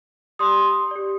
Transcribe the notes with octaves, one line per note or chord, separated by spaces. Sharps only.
G4 D5 C6 D#6
G4 D5